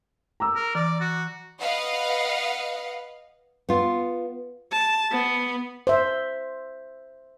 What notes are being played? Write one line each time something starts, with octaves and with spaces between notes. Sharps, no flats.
A#5 D6 E6
A#4
E3 D5
F#4
B4 D#5 F5 F#5
B3 F4
A5
B3
C5 E5